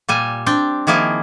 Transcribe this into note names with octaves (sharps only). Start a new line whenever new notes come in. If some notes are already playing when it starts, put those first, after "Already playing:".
A#2 G3 G#5
C4 D4 G5
D#3 F3 A#3 E4 G#4